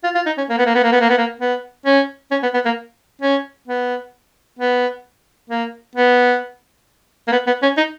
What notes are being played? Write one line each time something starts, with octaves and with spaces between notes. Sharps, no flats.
F4
F4
D#4
C#4
A#3
B3
A#3
B3
A#3
B3
A#3
B3
A#3
B3
C#4
C#4
B3
B3
A#3
C#4
B3
B3
A#3
B3
A#3
B3
B3
C#4
D#4